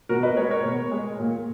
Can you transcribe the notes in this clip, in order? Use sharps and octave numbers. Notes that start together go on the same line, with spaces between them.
B2 F#4 A#4
B4 D#5
G#3 A#4 C#5
A#4 C#5
B2
G#3
A#2